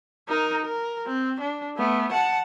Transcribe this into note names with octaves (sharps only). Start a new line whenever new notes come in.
D#4 A#4
A#4
C4
D4
A3 B3
F#5 A5